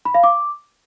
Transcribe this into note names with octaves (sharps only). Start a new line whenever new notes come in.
B5
F5
D6